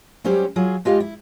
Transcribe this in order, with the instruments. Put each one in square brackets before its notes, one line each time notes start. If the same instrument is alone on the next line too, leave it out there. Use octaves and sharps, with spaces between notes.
[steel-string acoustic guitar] F#3 G3 C#4 G4 C5
F#3 F4 G#4
G#3 F4 G4 D#5 F5
E4